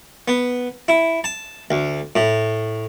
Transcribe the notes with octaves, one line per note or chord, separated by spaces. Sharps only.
B3
E4
A5
D2
A2